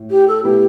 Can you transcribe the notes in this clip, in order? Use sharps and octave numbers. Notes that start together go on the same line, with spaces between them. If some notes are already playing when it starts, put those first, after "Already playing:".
Already playing: A2
G4
A4
B2 A3 E4 G4 B4 E5